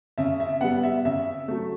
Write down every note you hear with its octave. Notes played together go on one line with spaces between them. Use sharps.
C#3 E5
E5
G3 B3 F#5
E5
C#3 E5
F#3 A3